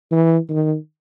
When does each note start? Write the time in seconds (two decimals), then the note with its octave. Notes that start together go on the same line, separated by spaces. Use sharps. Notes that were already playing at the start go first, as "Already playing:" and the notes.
0.12 E3
0.49 D#3